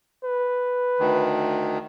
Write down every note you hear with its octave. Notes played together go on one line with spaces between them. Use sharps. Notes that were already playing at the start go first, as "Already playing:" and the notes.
B4
D2 D#3